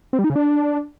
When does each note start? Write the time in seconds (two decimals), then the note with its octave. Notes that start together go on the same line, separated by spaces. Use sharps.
0.13 C4
0.19 G3
0.24 D#4
0.30 C#3
0.36 D4